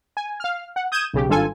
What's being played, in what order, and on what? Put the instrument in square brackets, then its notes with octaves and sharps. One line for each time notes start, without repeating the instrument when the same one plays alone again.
[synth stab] G#5
F5 F6
F#5
D#6 G6 G#6 D#7 E7
B1 C#3 G4
G#1 G2 F4 A4 G#5